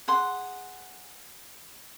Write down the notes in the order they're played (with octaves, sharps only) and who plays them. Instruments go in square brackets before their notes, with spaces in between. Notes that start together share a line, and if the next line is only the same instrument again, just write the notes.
[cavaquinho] G#4 F#5 C6